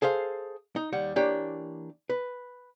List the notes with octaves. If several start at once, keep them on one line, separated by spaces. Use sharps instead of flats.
G#4 A4 C5 F5
D#4
D#2 G3 F#5
E3 A#3 D4 G4 C#5
B4